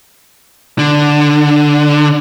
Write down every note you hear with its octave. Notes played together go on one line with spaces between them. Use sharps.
D3